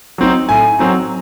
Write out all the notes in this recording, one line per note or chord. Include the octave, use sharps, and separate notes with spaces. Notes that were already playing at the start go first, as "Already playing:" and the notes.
F#3 C4 D#4
A2 G#5
F#3 C4 D#4